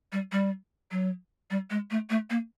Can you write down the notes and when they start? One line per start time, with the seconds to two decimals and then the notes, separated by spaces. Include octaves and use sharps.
0.12 G3
0.32 G3
0.91 F#3
1.51 G3
1.70 G#3
1.91 A3
2.10 A3
2.30 A#3